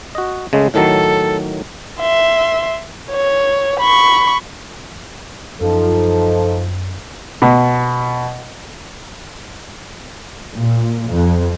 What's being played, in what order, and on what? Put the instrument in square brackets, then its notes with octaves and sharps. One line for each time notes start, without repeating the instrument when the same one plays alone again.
[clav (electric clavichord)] F#4 D#5
C#3 G#3 A3
[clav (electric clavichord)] A2 D#3 F#3 [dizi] A4
[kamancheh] E5 C6
C#5
B5 C#6
[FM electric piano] F#2 [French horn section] F3 D#4 [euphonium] A4
[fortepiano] B2
[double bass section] A#2
F2